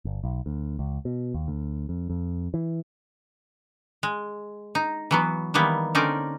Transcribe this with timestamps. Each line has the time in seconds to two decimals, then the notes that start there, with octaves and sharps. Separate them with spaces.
0.05 G1
0.24 B1
0.46 D2
0.79 C#2
1.05 B2
1.34 D#2
1.48 D2
1.89 F2
2.10 F2
2.54 E3
4.03 G#3
4.75 D#4
5.11 E3 F#3 B3
5.54 D#3 E3 G3 A#3 B3
5.95 D3 C4 C#4 D#4 A#4 D5